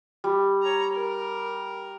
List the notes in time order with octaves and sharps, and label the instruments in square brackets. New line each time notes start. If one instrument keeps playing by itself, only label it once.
[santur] G3
[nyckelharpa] C#5 A#5
A#4